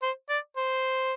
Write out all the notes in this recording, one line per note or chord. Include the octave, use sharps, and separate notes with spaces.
C5
D5
C5